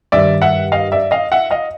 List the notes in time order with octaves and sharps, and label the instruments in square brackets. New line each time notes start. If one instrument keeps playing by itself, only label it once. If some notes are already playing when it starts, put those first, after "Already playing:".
[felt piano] G2 D#3 G3 [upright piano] D5 E5
[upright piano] E5 F#5
D#5 F5
D5 E5
D#5 F5
E5 F#5
D#5 F5